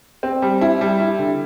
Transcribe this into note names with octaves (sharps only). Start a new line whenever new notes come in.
C4
G3
E4
G3
E4
D3